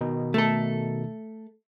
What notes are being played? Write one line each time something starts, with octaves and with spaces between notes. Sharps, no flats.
B2 D#3 D#4
A3 A4